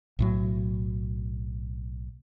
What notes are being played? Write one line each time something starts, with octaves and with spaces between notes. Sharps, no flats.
B1 A2 F#3